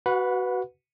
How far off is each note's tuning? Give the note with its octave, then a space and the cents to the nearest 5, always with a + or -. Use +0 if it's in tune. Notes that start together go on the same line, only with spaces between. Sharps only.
F#4 +20 B4 +0 F#5 -30